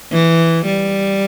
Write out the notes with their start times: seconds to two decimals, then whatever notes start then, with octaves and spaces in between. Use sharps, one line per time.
0.12 E3
0.66 G3